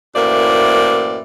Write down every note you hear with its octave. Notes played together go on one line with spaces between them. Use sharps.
F#2 A2 E3 A#3 C5 D5